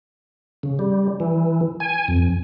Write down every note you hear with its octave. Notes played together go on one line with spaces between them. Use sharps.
C#3
G3
E3
G#5
F2